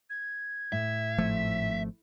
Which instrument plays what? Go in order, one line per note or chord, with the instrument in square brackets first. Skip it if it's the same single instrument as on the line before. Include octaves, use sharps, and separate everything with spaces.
[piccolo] G#6
[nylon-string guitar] A2 [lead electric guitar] E5
[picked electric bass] G#1 F3 A3
[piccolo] B6